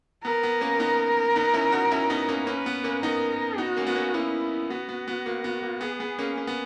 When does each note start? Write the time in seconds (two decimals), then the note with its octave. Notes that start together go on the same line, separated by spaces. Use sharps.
0.24 B3 A#4
0.43 B3
0.61 A#3 C#4
0.79 B3 D#4
1.36 B3 D#4
1.54 C#4 E4
1.72 D#4 F#4
1.91 C#4 E4
2.10 B3 D#4
2.28 A#3 C#4
2.46 A#3 C#4 B4
2.66 B3
2.84 A#3 C#4
3.03 B3 D#4 A#4
3.58 B3 D#4 F#4
3.77 A#3 C#4
3.87 B3
3.95 A#3 C#4
4.14 A#3 C#4 E4
4.69 B3 F#4
4.89 B3
5.08 B3
5.26 A#3
5.44 B3
5.63 A#3
5.81 B3 G#4
6.00 B3
6.19 A#3 C#4
6.38 C#4
6.47 B3